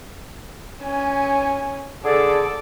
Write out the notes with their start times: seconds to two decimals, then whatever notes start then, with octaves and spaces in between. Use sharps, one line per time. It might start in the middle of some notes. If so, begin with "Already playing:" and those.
0.82 C#4 G#5
2.04 D3 G#4 A4 D5